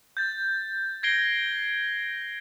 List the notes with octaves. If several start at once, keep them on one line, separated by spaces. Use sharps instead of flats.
G6 A6
G#6 A#6 C7 D7 G7